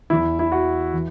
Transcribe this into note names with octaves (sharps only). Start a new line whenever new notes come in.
E2 E3 E4
E4
F#4
E3